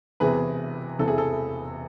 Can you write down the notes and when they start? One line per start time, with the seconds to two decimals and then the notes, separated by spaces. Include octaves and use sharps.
0.20 E1 E2 C3 E3 G#4 B4
0.99 E1 E2 C3 E3 A4
1.08 G#4
1.18 A4